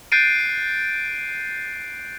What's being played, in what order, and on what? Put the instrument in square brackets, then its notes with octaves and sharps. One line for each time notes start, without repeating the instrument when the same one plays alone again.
[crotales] F#6 G6 A6 C7 D7 D#7